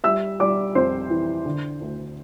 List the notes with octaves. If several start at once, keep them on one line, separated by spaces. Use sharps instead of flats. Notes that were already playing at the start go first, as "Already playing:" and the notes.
G3 E5 E6
G3 D5 D6
F2 C5 C6
E3
D3
D2